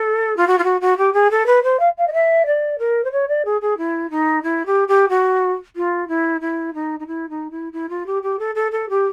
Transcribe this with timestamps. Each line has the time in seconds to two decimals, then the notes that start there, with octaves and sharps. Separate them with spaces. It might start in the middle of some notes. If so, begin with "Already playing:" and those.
Already playing: A4
0.36 F4
0.47 F#4
0.58 F4
0.64 F#4
0.81 F#4
0.97 G4
1.13 G#4
1.31 A4
1.46 B4
1.63 C5
1.79 F5
1.97 F5
2.07 D#5
2.13 E5
2.46 D5
2.78 A#4
3.04 C5
3.11 C#5
3.28 D5
3.45 G#4
3.61 G#4
3.77 E4
4.10 D#4
4.43 E4
4.66 G4
4.88 G4
5.09 F#4
5.76 F4
6.08 E4
6.41 E4
6.74 D#4
6.99 D#4
7.07 E4
7.29 D#4
7.51 E4
7.72 E4
7.89 F4
8.06 G4
8.22 G4
8.39 A4
8.55 A4
8.71 A4
8.89 G4